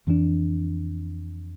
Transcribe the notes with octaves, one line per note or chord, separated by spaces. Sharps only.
F2 E3 B3 D4